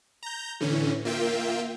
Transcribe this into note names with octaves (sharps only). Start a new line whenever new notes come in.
A#5 G6
A2 D3 E3 C#4
A#3 F4 E5 G5